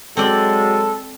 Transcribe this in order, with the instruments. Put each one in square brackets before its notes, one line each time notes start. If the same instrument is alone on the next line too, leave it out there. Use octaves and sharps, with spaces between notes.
[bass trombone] F#3 [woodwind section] G#3 [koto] C4 D5 [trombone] A4